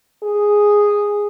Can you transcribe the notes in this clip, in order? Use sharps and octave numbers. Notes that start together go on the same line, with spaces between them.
G#4